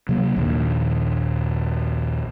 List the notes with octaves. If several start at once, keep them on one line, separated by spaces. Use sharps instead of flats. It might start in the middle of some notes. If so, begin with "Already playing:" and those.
C3 F#3 A#3
A#1 D#2